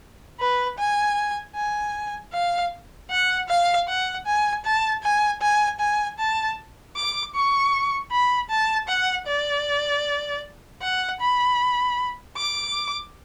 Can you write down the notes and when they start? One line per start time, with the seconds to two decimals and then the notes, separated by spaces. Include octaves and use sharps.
0.40 B4
0.79 G#5
1.56 G#5
2.33 F5
3.10 F#5
3.49 F5
3.88 F#5
4.26 G#5
4.65 A5
5.03 G#5
5.41 G#5
5.80 G#5
6.19 A5
6.96 D6
7.35 C#6
8.11 B5
8.50 A5
8.88 F#5
9.27 D5
10.82 F#5
11.21 B5
12.37 D6